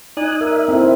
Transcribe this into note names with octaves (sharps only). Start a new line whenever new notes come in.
D#4 D5 G#5 D#6 F#6
A#4 E5
C4 E4 A4